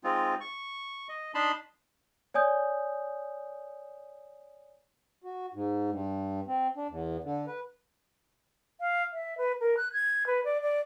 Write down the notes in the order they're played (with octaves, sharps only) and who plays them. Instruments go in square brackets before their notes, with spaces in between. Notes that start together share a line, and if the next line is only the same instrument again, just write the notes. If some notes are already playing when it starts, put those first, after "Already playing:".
[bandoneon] G#3 C4 D#4 F4
C#6
D#5
D4 D#4 A5 B5 C6
[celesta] C#5 D5 G#5 D#6 G6
[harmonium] F#4
G#2
G2
C4
D4
E2
D3
B4
[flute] F5
E5
B4
A#4
F#6
G#6
B4
D5
D5